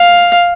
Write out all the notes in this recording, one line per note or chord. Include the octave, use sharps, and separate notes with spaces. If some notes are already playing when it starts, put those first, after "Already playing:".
Already playing: F5